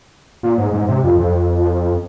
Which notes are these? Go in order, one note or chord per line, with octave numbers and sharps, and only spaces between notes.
A#2
G#2
G#2
C3
F2
F2